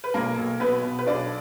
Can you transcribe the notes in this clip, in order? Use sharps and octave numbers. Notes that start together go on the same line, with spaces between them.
B4
B1 A#3 A#4
B1
B2 B3 B4
B2
B4
B1 D4 D5